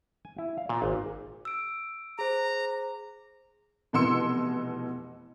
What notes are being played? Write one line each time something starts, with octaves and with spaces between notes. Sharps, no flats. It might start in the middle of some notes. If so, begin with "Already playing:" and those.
G#5
E4
F5
A#2
G#1
E6 D7
G#4 C5 A#5
F1 B2 E3 C6 E6 C#7